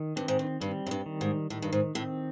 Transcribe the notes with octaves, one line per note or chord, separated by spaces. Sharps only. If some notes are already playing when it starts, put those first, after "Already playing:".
Already playing: D#3
G2 C4
G#2
G2
G2 G3
F#2
G2
D#3
G#2
A2 D#3
G2
G#2
A2 C4